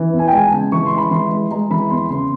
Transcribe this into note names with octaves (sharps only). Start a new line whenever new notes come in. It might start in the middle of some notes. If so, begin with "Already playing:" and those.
Already playing: E3
E2
G#5
G5
G#3 G#5
A5
C#3
E3 C#6
C6
G#3
B5
E3 C6
G#3
G#3 A#5
E3 B5
E2 C6
C#3 C6